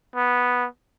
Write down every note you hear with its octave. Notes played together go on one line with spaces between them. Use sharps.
B3